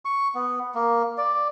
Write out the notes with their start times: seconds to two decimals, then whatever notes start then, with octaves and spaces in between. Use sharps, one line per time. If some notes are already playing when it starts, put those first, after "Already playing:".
0.05 C#6
0.34 B3
0.74 A#3
1.18 D5